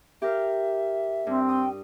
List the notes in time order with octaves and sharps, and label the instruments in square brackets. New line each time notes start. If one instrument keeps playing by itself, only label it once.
[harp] G4 A#4 F5 [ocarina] E5
[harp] G2 [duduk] C4
[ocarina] G5 [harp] D#6